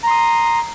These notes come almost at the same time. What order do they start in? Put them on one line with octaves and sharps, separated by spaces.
A#5 C6 D#6